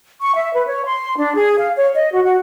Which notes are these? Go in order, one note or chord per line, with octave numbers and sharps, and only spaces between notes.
C#6
E5
B4
C#5
C6
D4
G#4
F5
C#5
D#5
F#4
F#4